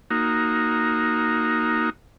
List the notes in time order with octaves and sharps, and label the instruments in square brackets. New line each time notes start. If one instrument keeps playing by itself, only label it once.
[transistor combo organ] A#3 D#4 F#4